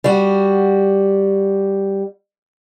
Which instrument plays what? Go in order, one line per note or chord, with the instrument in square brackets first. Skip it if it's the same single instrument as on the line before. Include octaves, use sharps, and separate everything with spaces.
[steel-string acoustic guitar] G3 F#4